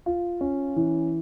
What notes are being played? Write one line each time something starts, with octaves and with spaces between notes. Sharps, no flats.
F4
C#4
E3